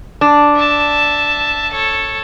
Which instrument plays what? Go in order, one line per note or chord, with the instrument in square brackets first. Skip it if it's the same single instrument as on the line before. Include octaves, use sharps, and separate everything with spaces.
[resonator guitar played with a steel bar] D4
[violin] E5 A5
A4 C#5